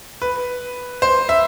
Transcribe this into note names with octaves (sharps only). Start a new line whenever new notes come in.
B4
C5
E5